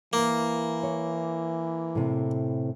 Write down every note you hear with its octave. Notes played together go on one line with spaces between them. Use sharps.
E3 A#3
C#5
A2 C3